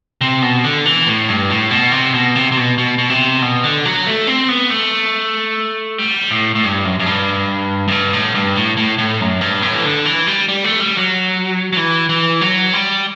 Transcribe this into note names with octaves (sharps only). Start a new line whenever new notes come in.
C3
B2
D3
E3
A2
G2
A2
B2
C3
B2
C3
C3
B2
B2
B2
C3
B2
D3
F#3
A3
C4
B3
A3
G3
A2
A2
G2
F#2
F#2
G2
F#2
G2
A2
G2
A2
A2
A2
F#2
G2
A2
E3
D3
E3
G3
G3
A3
G3
F#3
F#3
E3
E3
F#3
G3